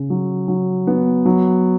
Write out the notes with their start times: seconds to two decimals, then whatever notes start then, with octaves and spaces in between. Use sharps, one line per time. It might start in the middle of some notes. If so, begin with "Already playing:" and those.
Already playing: C#3
0.10 F#3
0.48 F#3
0.87 B3
1.25 F#3